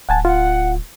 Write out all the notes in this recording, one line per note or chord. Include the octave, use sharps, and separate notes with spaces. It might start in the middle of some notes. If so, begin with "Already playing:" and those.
D1 F#5 G#5 A5
F4 F#5